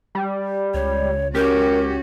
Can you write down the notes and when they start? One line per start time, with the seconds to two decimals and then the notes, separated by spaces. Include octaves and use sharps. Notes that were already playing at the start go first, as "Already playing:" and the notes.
0.15 G3
0.74 C#2 C#5
1.35 C#4 F#4 G4 A#4